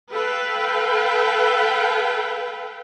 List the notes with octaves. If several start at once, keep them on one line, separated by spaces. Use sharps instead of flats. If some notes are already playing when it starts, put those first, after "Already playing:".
A4 B4 F5 G5